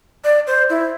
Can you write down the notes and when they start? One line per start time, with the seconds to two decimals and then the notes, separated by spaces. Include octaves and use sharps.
0.24 D5
0.47 C5
0.70 E4